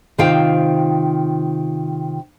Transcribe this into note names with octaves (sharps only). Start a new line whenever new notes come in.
C3 D#3 F4 C5 F5 G5